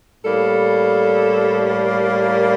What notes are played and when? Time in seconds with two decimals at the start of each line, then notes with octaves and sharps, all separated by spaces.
0.22 A2 G3 A#3 A4
2.11 A#4